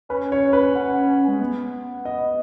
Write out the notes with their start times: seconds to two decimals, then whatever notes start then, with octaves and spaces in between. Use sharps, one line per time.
0.09 C#4 B4
0.32 C#5
0.53 B4
0.75 F#5
1.28 G#3
1.40 B3
2.05 D#5